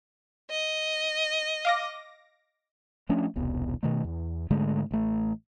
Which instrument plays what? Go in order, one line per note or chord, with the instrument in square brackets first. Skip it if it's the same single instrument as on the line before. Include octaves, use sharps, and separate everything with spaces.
[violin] D#5
[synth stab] F5 D6 A#6
[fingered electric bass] F3 A3 C#4 D4
E1 C2 B3
B2 D#3 A3
E2
G#2 D3 G#3 A3
A1 A3